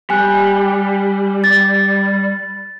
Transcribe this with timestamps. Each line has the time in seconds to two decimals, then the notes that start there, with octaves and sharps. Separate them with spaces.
0.10 G3 G#5 F#6
1.44 A6